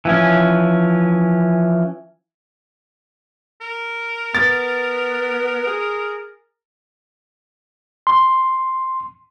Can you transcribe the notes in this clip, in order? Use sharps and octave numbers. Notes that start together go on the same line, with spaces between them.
E3 F3 C#4
A#4
B3 A6
G#4
C6